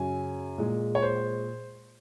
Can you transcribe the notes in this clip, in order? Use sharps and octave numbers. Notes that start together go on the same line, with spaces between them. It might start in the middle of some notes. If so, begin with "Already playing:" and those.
Already playing: F#2 C#3 F#3 G#5
A#2 G#3
C#5
C5